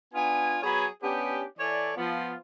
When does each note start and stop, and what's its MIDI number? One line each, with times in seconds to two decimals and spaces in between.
0.14 0.58 59
0.14 0.58 62
0.14 0.58 65
0.14 0.58 80
0.62 0.86 54
0.62 0.86 59
0.62 0.86 68
0.62 0.86 73
0.62 0.86 80
0.62 0.86 83
1.02 1.42 59
1.02 1.42 61
1.02 1.42 62
1.02 1.42 67
1.58 1.93 52
1.58 1.93 69
1.58 1.93 73
1.58 1.93 74
1.96 2.34 53
1.96 2.34 59
1.96 2.34 65